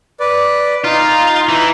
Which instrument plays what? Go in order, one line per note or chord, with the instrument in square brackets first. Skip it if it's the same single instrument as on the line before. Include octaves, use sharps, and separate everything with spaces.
[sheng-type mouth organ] B4 D5
[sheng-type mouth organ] D#4 [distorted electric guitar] F4
[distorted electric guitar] E3